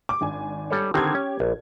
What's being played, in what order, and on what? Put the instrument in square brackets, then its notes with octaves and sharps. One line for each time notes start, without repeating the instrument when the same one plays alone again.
[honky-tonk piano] D6
G#1 D4 G#5
[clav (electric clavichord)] G3 A4 C#5
[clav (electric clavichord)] D3 D#3 C4 [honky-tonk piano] G4 G#6
[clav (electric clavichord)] C#4
A#1